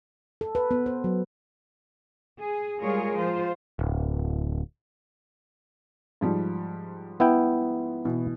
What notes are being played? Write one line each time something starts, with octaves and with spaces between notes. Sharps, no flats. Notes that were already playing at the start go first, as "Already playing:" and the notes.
A4
B4
B3
C5
F#3
G#4
G3 G#3 F4 G#4 A#4 C#5
F3 F4 C5
D1
G#2 F3 G3
B3 E4 G5
B2 E3